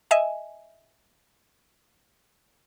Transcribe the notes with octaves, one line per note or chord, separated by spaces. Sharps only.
D#5 E5 G#5